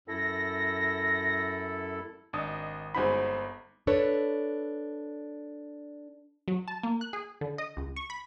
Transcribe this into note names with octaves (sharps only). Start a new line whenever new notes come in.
F#2 E4 A4 A#6
G#1 D4 D#5 D#6
G1 G#3 C4 D#4 F#4 B5
D4 A4 B4 C#5
F#3
A5
A#3
F#6
G#4
D3
D#5
C#2
C#6
B5